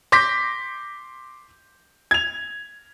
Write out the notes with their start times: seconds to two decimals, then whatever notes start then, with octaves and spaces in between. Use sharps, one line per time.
0.12 C6 D6 G6 A#6 B6
2.11 G#6 F7